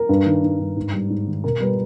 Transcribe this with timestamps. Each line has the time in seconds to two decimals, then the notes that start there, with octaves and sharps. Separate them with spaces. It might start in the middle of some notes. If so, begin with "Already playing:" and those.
Already playing: A#4
0.09 G2
0.26 D#3
0.43 D#3
0.59 G2
0.76 G#2
0.93 G3
1.10 G#2
1.27 D#3
1.44 B2 A#4
1.60 G3 B4